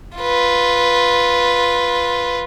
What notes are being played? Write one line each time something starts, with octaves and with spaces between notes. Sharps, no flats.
F4 B4